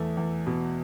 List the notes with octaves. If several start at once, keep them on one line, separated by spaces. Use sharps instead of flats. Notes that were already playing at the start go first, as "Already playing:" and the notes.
Already playing: E2 A3
E2
B2